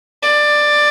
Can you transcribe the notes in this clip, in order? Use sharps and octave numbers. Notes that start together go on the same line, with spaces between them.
D5